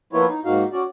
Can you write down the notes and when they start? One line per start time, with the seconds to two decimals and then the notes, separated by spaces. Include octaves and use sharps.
0.13 F3 A#3 B3 E4 F4 C#5
0.29 D#4
0.45 G#2 A#3 D#4 F#4 F5
0.72 C#4 F#4 D5